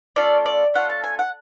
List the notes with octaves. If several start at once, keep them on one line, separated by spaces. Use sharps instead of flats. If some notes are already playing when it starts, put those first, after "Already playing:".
A3 C#4 F4 A4 D5
D5
A3 C#4 F4 A4 F#5
A5
G#5
F#5